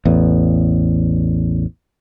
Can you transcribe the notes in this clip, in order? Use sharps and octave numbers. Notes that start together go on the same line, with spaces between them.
A1 E2